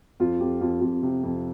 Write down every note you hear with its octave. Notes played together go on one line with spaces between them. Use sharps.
F2 F4
F2 G4
F2 F4
F2 F4
C3
F2